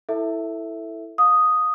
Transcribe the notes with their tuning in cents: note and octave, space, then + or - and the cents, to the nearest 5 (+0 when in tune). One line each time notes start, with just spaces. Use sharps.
E4 +0 A4 +10 E5 +0
F5 +20 D#6 +0